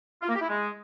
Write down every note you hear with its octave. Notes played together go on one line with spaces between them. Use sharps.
F4
A#3
G4
E4
G#3